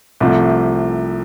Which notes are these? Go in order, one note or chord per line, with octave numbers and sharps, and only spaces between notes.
C2 C3 F3 A3